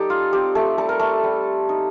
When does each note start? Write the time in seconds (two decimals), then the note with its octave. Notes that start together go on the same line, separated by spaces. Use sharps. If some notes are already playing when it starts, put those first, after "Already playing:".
Already playing: G3 D#4 G4 A4
0.10 F4
0.33 C4 G4
0.55 A3 A4
0.78 G3 A4
0.89 A#4
0.99 A3 A4
1.24 G3
1.69 D#4